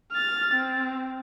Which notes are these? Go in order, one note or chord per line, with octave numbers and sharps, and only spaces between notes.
F6 A6
C4